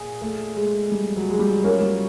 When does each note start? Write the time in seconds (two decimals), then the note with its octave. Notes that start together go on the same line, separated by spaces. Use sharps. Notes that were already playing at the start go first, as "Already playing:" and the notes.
Already playing: A#2 G#4
0.22 A3
0.57 G#3
0.92 G3
1.16 F#3
1.30 G#3
1.39 G3
1.63 F#3 A#3 C#4 F4 A#4 C#5
1.81 G3